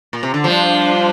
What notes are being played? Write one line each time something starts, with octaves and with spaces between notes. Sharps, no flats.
A#2
C3
D3
F3 G3 D4 F4 C5